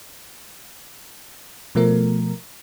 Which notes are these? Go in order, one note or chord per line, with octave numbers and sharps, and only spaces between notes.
B2 F3 A3 A#4